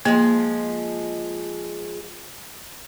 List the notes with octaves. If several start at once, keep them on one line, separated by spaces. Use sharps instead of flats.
F3 G#3 A#3